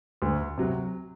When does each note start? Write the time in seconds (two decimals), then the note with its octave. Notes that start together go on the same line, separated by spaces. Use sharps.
0.22 D2
0.58 C3 F#3